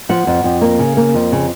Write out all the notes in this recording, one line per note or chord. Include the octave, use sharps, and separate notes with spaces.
F3 F#5
F2
F2
A#3
C#3
A#3
F2
C#3